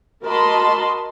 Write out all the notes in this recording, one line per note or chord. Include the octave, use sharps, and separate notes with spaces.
F#4 A#4 D#5 A5 B5 C6